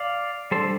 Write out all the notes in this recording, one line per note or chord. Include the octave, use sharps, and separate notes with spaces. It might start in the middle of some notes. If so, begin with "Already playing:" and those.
Already playing: D5 F5
G3 D4 A4 C5